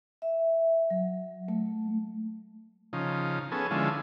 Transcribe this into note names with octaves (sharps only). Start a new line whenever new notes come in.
E5
F#3
A3
C#3 F3 D#4
B3 C#4 G#4 A4
D3 F3 G#3 C#4 E4